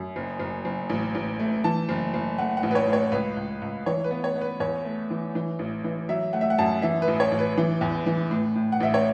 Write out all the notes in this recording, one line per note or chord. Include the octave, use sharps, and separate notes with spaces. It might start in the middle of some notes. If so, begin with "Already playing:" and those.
Already playing: F#2
F#1
F#1
F#1
A1
A1
A3
E3 A5
F#1
F#1
A3 F#5
F#5
A1
B4
C#5
A2
C#5
C#2 B4
C#2
C#2
E3 C#5
B4
B3
C#5
B3
B4
E2 C#5
A3
E3
E3
A1
E3
F#3 E5
A3 F#5
E5
F#5
F#2 A5
E3 E5
B4
A1
C#5
A1
B4
E3
E2
E3
A2
A2
F#5
A1 E5
C#5